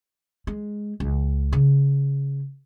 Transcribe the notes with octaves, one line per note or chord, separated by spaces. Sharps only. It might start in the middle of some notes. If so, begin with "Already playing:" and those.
G#3
C#2
C#3